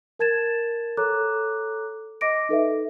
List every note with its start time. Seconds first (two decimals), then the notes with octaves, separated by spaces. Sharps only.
0.19 A#4 A5 G#6 A6 E7
0.97 A4 C#5 A#5 D6 F#6
2.21 D#5 D6 A#6 D7
2.49 D#4 A4 B4 E5